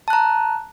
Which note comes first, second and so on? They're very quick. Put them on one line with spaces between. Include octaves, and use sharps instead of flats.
A5 F#6 A#5